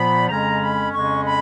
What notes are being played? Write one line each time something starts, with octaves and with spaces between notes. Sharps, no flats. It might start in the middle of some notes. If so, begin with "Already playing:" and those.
Already playing: A#2 F3 B3 B5
F2 C#3 G#3 C#4 A#5
B5
F2 C#3 G#3 C#4 C#6
B5